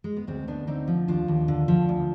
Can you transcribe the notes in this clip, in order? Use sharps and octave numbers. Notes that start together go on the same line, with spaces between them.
G#3
B3
D2 G#3 C4
D2 B3 D4
D3 C4 D#4
F3
D#2 D4 F4
D#2
D3
F3
D2